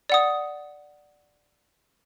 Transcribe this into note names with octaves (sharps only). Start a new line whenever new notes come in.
D5 F#5 D#6